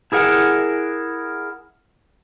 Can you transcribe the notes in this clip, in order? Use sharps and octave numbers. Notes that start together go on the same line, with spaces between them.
E4 G#4 A#4 F#5